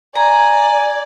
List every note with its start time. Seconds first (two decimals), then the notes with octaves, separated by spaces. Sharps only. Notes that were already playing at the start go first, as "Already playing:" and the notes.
0.15 D5 G#5 A#5